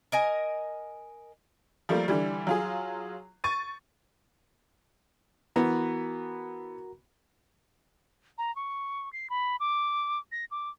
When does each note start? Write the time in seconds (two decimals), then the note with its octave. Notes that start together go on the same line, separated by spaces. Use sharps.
0.12 A#4 D#5 G#5
1.89 F3 G3 A3 A#3
2.08 D3 E3 G3
2.47 F#3 F4 G#4
3.44 C#6 A6 D#7
5.56 E3 B3 F#4 A#4 A#5
8.38 A#5
8.56 C#6
9.13 C7
9.30 B5
9.60 D6
10.32 A#6
10.51 D6